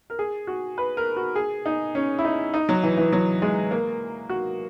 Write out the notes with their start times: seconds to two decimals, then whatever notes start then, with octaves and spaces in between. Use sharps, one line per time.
0.10 A#4
0.19 G#4
0.47 F#4
0.78 B4
0.97 A#4
1.16 F#4
1.35 G#4
1.66 D#4
1.95 C#4
2.19 E4
2.25 D#4
2.54 D#4
2.69 F#3
2.83 E3
2.97 E3
3.13 F#3
3.42 G#3
3.71 A#3
4.29 F#4